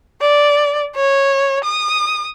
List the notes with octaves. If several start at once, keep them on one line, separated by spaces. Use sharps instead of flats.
D5
C#5
D#6